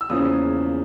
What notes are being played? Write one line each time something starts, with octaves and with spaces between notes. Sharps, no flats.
E6
E2 C#3 F3 A#3 C#4 D#6